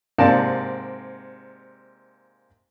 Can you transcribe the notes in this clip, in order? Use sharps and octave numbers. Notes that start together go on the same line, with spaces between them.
G#2 C3 A#3 D5 F5 A5